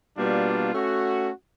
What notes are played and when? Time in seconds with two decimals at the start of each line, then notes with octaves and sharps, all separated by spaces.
0.17 B2 G3 A#3 D4 F4
0.74 A3 C#4 F#4